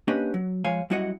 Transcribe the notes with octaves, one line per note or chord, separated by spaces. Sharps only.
A#3 C#4 D4 G4 B4 D#5
F#3
F3 G#3 C#5 F5 G#5
F#2 G3 E4 F#4 D#5 F#5